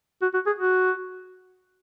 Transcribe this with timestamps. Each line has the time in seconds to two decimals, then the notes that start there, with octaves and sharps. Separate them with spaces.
0.22 F#4
0.34 F#4
0.46 G#4
0.58 F#4